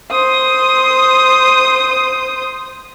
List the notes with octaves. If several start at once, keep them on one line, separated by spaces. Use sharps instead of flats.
C5 D#6